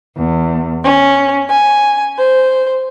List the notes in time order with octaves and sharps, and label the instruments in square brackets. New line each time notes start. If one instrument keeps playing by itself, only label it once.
[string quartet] E2
C#4
G#5
C5